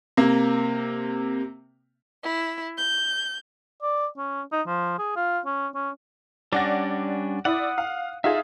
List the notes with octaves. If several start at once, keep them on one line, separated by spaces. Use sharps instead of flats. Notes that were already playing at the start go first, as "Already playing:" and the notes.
C3 A#3
E4
G6
D5
C#4
D#4
F3
G#4
F4
C#4
C#4
G3 C#4 D4 D5 F#5 A#6
E4 D5 F#5 D#6
F5
D#4 F4 G#4 E5